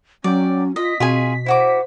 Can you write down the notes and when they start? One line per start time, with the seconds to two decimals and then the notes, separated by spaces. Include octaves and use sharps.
0.24 F#3 C#4 D5 G5
0.76 F4 D#5 B6
1.00 B2 C4 F4 G#4 G#5
1.46 E4 F#4 C5 D6